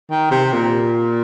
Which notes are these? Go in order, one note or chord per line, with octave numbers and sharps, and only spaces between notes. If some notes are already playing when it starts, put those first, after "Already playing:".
D#3
C3
A#2